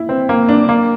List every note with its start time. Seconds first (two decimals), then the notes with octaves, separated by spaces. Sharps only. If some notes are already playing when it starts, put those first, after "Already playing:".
Already playing: E4
0.09 C4
0.29 A#3
0.49 D4
0.69 A#3